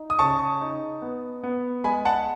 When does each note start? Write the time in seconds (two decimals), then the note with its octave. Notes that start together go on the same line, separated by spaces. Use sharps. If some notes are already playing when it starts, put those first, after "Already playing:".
Already playing: D#4
0.10 D#6
0.19 C#3 A5 C#6
0.61 D#4
1.02 B3
1.43 B3
1.84 G#3 G#5 B5
2.05 F#5 A5